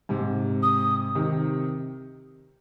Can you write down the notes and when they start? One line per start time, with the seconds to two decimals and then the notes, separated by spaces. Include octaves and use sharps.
0.09 G#2 C3
0.62 D#6
1.15 C3 D#3